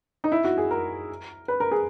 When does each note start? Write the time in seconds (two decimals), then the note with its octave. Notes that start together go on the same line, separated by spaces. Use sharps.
0.24 D#4
0.32 E4
0.44 F#4
0.58 G#4
0.71 A#4
1.48 B4
1.60 A#4
1.71 G#4